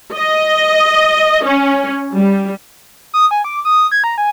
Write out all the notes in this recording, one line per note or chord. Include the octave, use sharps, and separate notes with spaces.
D#5
C#4
G3
D#6
G#5
D6
D#6
G#6
A#5
G#5